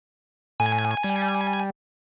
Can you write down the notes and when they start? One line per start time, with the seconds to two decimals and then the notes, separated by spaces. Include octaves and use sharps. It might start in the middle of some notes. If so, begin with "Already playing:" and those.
0.60 A2 G#5
1.04 G3